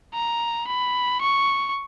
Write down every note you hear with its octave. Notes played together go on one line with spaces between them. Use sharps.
A#5
B5
C#6